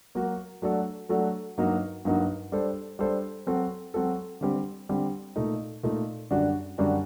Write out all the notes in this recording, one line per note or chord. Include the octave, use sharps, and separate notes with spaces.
F#3 A#3 F#4 A#4
F#3 A3 D4 F#4 A4
F#3 A3 D4 F#4 A4
G2 F#3 A#3 D#4 F#4
G2 F#3 A#3 D#4 F#4
G3 D4 A4 C5
G3 D4 A4 C5
F#3 C4 F#4 A4
F#3 C4 F#4 A4
D3 G3 C4 G4
D3 G3 C4 G4
A#2 A3 D#4
A#2 A3 D#4
F#2 D3 G3 D4 F#4
F#2 D3 G3 D4 F#4